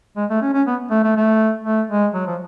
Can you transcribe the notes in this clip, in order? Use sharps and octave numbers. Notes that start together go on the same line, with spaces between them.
G#3
A3
C#4
C#4
B3
A3
A3
A3
A3
G#3
F#3
F3